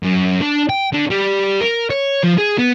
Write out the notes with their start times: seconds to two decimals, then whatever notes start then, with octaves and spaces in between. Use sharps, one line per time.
0.03 F#2
0.41 D4
0.70 G5
0.93 D3
1.10 G3
1.61 A#4
1.91 C#5
2.24 F3
2.38 G#4
2.59 B3